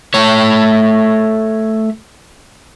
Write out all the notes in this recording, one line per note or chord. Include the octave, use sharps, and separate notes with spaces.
A3 C#5